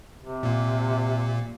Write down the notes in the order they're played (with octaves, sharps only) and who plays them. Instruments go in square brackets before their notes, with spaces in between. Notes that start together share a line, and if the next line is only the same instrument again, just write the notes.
[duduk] C3
[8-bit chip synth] A#2 A#3